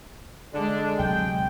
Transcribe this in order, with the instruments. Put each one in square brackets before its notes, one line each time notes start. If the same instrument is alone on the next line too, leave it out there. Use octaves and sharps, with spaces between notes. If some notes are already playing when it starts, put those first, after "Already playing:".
[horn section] D3 D4 [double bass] G#3
[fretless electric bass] D2 C3 F#3 [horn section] G5